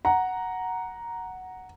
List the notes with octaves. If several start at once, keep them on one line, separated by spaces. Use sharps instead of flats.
F#5 A#5